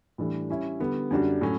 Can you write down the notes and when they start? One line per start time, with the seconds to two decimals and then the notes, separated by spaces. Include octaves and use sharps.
0.18 A2 E3 G3 D4 A4
0.49 G3 C#4 E4
0.80 D3 G3 B3
1.11 F#2 D3 G3 D4 F#4
1.41 A2 F#3 C#4